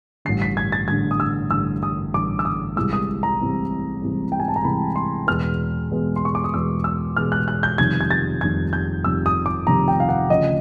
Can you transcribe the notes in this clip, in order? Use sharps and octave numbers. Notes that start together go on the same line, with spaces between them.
A1 G2 D3 C7
B6
G#6
A6
A1 G2 D3 G#6
D#6
E6
A1 G2 D3 E6
D#6
A1 G2 D3 D6
E6
D#6
C2 C3 E3 G#3 E6
D#6
A#5
C2 C3 E3 G#3
C2 C3 E3 G#3
G5
G#5
A5
A#5
C2 C3 E3 G#3 B5
C6
E2 B2 G#3 B3 F6
E2 B2 G#3 B3
C6
C#6
D6
D#6
E2 B2 G#3 B3 E6
E6
E2 B2 G#3 B3 F6
F#6
F#6
G6
F1 F2 C3 D#3 G3 G#6
G#6
A6
F1 F2 C3 D#3 G3 G#6
G6
F1 F2 C3 D#3 G3 E6
D#6
D6
F1 F2 C3 D#3 G3 A#5
G5
F5
F#5
D2 C#3 F3 D#5